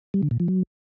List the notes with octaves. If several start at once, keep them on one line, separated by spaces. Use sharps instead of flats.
G3
D3
A#2
F3
F#3